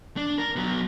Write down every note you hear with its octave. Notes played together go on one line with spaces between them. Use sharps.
D4
A#4
F#3 B3